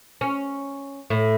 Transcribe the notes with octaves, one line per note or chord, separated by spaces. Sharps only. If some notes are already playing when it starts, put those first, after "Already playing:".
C#4
A2